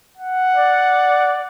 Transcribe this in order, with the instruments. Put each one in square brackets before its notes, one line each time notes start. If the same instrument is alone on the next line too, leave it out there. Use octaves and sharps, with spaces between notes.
[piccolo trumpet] F#5
[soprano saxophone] D5